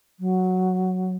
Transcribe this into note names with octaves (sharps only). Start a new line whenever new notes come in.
F#3